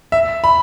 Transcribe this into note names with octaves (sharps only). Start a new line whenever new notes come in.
E5
B5